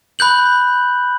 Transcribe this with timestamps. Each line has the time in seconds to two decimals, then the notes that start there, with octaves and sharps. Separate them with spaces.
0.19 B5 F#6 G6 F#7